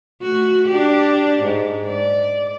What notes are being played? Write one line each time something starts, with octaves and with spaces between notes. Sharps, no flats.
A3 F#4
D4 G4
G#2
D5